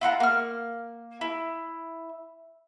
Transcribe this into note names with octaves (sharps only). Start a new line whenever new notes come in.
E4 F4 F#5 A#5
A#3 F6
E4